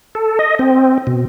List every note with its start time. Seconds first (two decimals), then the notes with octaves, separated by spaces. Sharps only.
0.15 A4
0.39 D#5
0.59 C4
1.07 B2